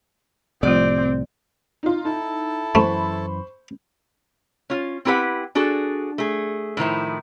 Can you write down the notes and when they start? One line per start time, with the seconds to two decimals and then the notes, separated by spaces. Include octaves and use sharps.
0.63 C2 A2 C3 F3 A3 C4 F4 D5
1.83 D#4 F4
2.05 D#4 E4 A4 A5
2.75 F#2 E3 A3 C5 B5 C#6
4.70 C#4 F4
5.05 C4 E4 G4 B4 F#5
5.55 D4 F#4 G#4 A4
6.18 A3 G#4
6.77 A2 D#3 F3 E4